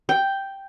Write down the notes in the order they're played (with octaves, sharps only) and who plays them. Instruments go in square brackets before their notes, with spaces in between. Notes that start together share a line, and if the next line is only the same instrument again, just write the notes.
[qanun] G5